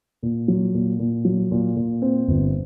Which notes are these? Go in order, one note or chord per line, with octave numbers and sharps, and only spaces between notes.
A#2
F#3
A#2
A#2
F#3
A#2
A#2
C4
G1